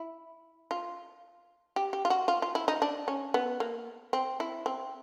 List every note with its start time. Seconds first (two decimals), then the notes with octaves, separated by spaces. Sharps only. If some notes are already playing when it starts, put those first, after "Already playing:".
Already playing: E4
0.71 F4
1.76 G4
1.93 G4
2.05 F4
2.10 F#4
2.28 F4
2.42 F4
2.55 E4
2.68 D#4
2.82 D4
3.08 C#4
3.34 B3
3.60 A#3
4.13 C4
4.40 E4
4.66 C4